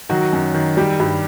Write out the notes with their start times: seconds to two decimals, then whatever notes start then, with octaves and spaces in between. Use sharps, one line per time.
0.09 D#3 F#3 F#4
0.33 F#2
0.54 D#3
0.77 G3 G4
1.00 G2